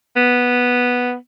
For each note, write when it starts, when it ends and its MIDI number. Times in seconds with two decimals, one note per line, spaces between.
0.16 1.15 59